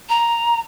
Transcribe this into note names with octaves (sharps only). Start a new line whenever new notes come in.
A#5